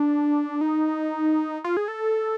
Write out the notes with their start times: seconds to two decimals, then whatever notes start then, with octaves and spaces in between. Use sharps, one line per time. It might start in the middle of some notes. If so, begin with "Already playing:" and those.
Already playing: D4
0.61 D#4
1.64 F4
1.77 G#4
1.88 A4